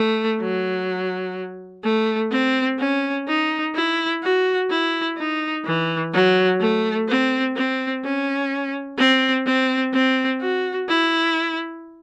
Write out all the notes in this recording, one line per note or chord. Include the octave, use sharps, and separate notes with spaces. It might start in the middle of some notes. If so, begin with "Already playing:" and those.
Already playing: A3
F#3
A3
C4
C#4
D#4
E4
F#4
E4
D#4
E3
F#3
A3
C4
C4
C#4
C4
C4
C4
F#4
E4